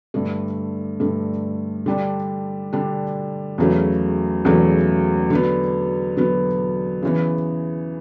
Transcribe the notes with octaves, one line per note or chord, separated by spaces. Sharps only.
G2 D3 A3
G2 D3 A3
D3 G3 D4
D3 G3 D4
E2 C#3 F#3 A3
E2 C#3 F#3 A3
D3 F#3 B3
D3 F#3 B3
C#3 E3 B3